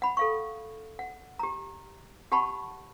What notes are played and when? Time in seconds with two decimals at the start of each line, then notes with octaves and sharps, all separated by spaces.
0.02 F#5 B5
0.17 A4 F5 C#6
0.99 F#5
1.39 G4 A#5
2.32 G4 F#5 A5 B5 C#6